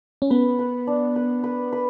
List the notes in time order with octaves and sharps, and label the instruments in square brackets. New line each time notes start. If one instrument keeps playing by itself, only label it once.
[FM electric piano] C#4
[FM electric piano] B3 [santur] B4
[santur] B4
D4
B4
B4
B4